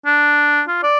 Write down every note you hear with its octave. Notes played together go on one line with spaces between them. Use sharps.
D4
F4
D5